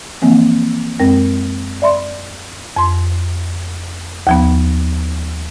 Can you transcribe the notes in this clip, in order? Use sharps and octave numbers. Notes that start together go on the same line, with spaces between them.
E3 F3 A#3 C4
F#2 G#3 C4 A#4 G5 A#6
D5 E5 B5 C6
F2 C6
D#2 F3 B3